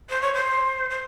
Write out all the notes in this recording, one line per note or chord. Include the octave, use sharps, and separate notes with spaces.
C5
C#5
C5
C5